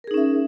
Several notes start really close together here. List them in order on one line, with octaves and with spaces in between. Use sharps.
A#4 G#4 D#4 C#4 E5